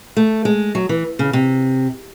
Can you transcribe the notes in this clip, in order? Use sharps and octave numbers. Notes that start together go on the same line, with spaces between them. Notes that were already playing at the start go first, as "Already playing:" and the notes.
A3
G#3
F#3
E3
C#3
C3